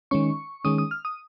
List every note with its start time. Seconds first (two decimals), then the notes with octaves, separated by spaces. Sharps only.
0.11 D#3 G#3 C#4 C#6
0.65 D#3 G#3 C#4 D#6
0.78 D#6
0.91 F6
1.05 D#6